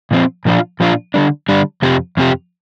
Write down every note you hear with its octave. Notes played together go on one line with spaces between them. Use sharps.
A#2 F3 C4
A#2 F3 D4 F4
A#2 F3 D4 F4
D3 G3 D4
D3 G3 D4
F2 C3 F3 C4 G4
F2 C3 F3 C4 G4